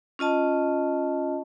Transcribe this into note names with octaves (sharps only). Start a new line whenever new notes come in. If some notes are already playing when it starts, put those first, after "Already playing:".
C#4 F4 D#5 A5